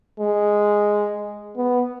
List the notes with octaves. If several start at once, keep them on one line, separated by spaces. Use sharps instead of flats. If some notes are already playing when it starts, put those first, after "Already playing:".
G#3
B3